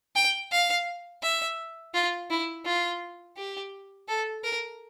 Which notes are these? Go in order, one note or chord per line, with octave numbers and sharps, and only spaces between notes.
G5
F5
E5
F4
E4
F4
G4
A4
A#4